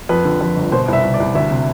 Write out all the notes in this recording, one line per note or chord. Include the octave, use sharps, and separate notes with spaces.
F2 B4
D3
F2 B4
G1
B2 C5
C2
E5
C2
D5
C2
D2 E5
C3